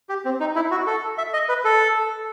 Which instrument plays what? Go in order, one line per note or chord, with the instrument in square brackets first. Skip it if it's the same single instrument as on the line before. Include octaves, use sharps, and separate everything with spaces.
[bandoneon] G4
C4
D#4
E4
F#4
A4
E5
D#5
B4
A4